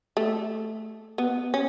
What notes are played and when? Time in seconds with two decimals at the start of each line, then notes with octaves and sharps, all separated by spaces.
0.17 A3
1.18 B3
1.54 C#4